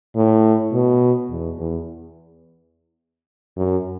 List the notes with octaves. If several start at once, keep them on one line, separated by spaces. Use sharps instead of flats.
A2
B2
E2
E2
F#2